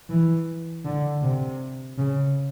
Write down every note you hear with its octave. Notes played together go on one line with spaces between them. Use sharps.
E3
D3
C3
C#3